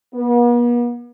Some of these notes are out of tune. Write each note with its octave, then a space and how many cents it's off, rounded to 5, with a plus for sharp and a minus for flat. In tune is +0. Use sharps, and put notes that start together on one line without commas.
B3 -45